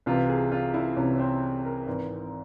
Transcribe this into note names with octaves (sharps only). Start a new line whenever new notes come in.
C2 C3 E3 F4
G#4
F4
E4
C2 C3 E3 C#4
C#4
C4
A#4
G#1 G#2 E3 A#4